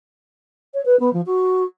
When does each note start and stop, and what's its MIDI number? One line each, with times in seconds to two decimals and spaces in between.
0.74 0.83 73
0.85 0.98 71
0.99 1.12 59
1.13 1.21 53
1.26 1.63 66